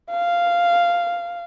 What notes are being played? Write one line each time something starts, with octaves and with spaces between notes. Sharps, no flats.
F5